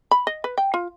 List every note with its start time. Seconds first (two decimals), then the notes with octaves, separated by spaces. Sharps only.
0.11 B5
0.27 D#5
0.44 B4
0.58 G5
0.74 F4